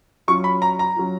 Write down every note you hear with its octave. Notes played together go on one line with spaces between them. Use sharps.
F#3 C#4 F4 C#6
B5
A#5
A#5
F#3 C#4 F4